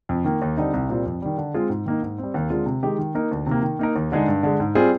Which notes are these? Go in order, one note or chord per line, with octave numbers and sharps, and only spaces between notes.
F2
D#3 A#3
D#2
D3 G3 C4 D#4
C2
A#2 G3 C4
F2
D#3 G3
D3
G#3 C4 F4 G#4
G#2
D#3 A#3 D#4
G#2
G3 C4
D#2
D3 G#3 C4 F4
C3
D#3 G#3 D#4 G4
D#3
A#3 D#4 A#4
D2
C3 D#3 A#3
D#3
A#3 D#4 A#4
D#2
D3 G#3 D#4 G#4
G2
D3 G#3
G#2
G3 C4 F4 G#4